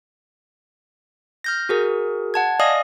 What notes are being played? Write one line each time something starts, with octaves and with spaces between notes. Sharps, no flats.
F6 G6 A#6
F#4 G#4 A#4
F#5 A5 G#6
D5 D#5 F5 G#5 D#6 A#6